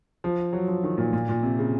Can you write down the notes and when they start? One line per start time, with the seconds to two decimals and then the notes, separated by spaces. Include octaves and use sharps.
0.24 F3
0.53 F#3
0.68 F3
0.84 D#3
0.98 A#2
1.13 A#2
1.29 A#2
1.43 C3
1.58 C#3